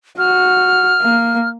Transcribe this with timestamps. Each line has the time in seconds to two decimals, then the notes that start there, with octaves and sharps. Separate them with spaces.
0.18 F#4 F6
1.01 A#3